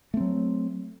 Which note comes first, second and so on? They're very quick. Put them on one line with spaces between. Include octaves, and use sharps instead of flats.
A3 C4 F#3